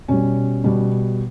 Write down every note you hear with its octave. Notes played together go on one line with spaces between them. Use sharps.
B2 G3 C#4
B2 G3